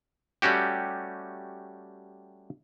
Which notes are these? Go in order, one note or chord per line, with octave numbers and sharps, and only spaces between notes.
G3 A3 C#4 F#4 G4